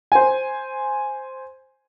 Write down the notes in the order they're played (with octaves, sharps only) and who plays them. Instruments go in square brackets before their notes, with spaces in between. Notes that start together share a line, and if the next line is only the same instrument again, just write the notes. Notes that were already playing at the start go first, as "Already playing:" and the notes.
[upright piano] C5 G#5